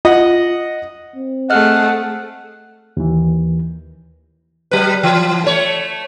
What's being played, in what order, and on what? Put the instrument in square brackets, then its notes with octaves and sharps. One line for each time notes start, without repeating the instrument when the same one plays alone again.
[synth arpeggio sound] F4 [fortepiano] D#5 F#5
[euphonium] C4
[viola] A3 G#4 [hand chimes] D#5 F6 F#6 [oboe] F#5
[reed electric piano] D#2 E3
[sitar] F#3 B4
E3
A3 C#5